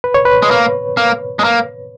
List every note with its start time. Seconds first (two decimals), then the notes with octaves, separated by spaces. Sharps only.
0.04 B4
0.14 C#5
0.25 B4
0.42 G#3
0.51 A#3
0.97 A#3
1.39 G#3
1.44 A#3